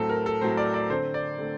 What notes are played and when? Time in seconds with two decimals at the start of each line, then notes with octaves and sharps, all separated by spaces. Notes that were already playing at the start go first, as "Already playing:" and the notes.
Already playing: A2 F#3 C4 A4
0.09 A#4
0.26 A4
0.41 A2 F#3 C4 C5
0.57 D5
0.74 D5
0.90 D3 A3 C4 C5
1.14 D5
1.38 D3 A3 C4